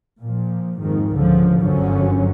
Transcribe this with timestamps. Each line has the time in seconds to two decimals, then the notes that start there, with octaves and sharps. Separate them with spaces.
0.20 A#2 F3
0.79 F2 G#2 D#3
1.13 C#2 D3 F3
1.59 G1 F#2 D3 F3 F#3 C#4